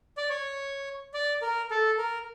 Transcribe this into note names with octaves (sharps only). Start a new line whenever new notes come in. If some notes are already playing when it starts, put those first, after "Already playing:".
D5
C#5
D5
A#4
A4
A#4